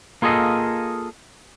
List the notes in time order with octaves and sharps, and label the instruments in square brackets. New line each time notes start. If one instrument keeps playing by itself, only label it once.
[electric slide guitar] A#3 F4 G#4 A4 D#5